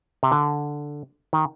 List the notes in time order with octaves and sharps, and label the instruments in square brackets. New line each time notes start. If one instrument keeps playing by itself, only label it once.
[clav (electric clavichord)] C3
D3
D#3